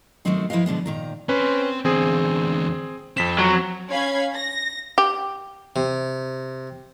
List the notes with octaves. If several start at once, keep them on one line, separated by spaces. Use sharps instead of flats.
D#3 F#3 A3 B3 C4 D#4
F3 E4 F4 B4 D#5 F5
B2 D3 G#3 B3
A#2 D#3 A#5
C4 C#4 B4 C5
E2 D3 C4 G#4
F2 C4 B6 E7
F#3
C#4 F5 B5 G#6
A#6
G4
C3